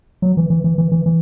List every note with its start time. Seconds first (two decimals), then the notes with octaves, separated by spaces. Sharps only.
0.22 F#3
0.37 E3
0.50 E3
0.64 E3
0.78 E3
0.92 E3
1.06 E3